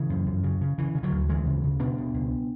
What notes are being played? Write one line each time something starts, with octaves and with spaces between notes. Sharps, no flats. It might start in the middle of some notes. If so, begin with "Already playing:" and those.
Already playing: C#3 E3
F#2
F#2
C#3
C#3
C#3 E3
C#3
D3 F#3
D2
D2 E3 G#3
C#3
C#3
B2 B3 D4
B2
C#2